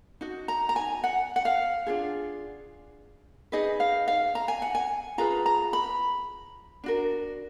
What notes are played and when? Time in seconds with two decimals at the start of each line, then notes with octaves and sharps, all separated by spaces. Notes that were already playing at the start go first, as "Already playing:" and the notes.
0.21 D#4 F#4
0.48 A#5
0.69 A#5
0.76 G#5
1.04 F#5
1.36 F#5
1.45 F5
1.87 D4 F4 G#4
3.52 D#4 G#4 B4 D#5
3.80 F5
4.08 F5
4.35 A#5
4.48 G#5
4.62 F#5
4.75 G#5
5.18 F4 G#4 B4 A#5
5.46 A#5
5.73 B5
6.84 D4 F#4 A#4